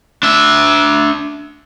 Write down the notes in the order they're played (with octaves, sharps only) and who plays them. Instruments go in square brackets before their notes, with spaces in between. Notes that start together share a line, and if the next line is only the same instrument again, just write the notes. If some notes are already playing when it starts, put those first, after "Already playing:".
[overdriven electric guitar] D4 E5